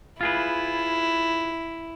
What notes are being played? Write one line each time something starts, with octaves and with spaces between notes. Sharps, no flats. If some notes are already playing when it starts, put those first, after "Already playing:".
E4 F4 G#4 B4